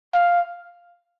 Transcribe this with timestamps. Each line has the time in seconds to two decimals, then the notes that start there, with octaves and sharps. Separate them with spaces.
0.13 F5